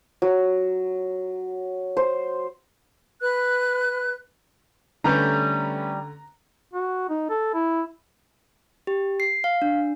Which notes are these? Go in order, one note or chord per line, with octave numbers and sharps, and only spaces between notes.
F#3
C5
B4 F#6
D3 G3 A3 C#4 B4 A#5
F#4
D#4
A4
E4
G4
C7
F5
D4